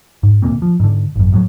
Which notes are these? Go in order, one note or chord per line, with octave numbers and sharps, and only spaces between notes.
G#2
D2 A#2 A#3 C4
F3
G#2 D3
G#1 F#2
D1 A2 D#3 F#3